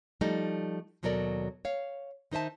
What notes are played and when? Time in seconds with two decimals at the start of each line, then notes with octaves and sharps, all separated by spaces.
0.21 F3 G3 A3 D#4
1.03 D#2 B2 F#3 A4 A#4 D5
1.65 C#5 F5
2.31 D#3 D#4 C5 E5 A5